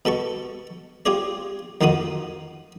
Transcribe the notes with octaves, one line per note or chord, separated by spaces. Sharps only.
B2 A4 A5 C#6
F4 G4 G#4 C#5 D5
F2 D#3 A#3 F4 F#4 D#6